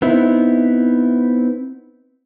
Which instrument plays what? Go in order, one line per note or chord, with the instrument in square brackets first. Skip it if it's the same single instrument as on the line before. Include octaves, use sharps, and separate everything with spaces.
[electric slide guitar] B3 C4 D#4 E4